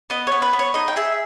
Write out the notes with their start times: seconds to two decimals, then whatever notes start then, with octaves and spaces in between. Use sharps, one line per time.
0.10 B3 D#5
0.27 B3 C#5
0.42 B4
0.53 B3
0.59 C#5
0.74 D#4 D#5
0.88 G5
0.96 G#4 E5